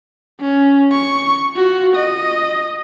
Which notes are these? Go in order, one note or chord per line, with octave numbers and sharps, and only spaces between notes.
C#4
C#6
F4 F#4
D#5